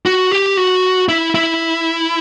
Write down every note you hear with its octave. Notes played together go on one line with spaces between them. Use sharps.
F#4
G4
F#4
E4
E4